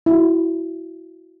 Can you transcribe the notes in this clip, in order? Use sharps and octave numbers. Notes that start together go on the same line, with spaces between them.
E4 F#4